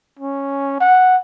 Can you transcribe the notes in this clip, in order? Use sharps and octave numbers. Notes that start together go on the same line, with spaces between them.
C#4
F#5